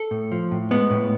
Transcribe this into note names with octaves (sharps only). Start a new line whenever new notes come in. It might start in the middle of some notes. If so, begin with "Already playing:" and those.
Already playing: A4
A2
F3
A2
G#3 B3
A2